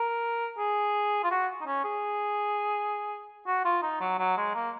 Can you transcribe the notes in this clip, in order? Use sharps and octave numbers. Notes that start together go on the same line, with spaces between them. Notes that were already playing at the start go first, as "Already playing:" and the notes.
Already playing: A#4
G#4
F4
F#4
D#4
C#4
G#4
F#4
F4
D#4
F#3
F#3
G#3
A#3